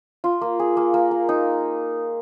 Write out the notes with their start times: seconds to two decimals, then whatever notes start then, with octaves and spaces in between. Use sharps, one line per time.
0.24 F4
0.41 A#3
0.59 G#4
0.77 A#3
0.94 A#3
1.11 A#4
1.29 D#4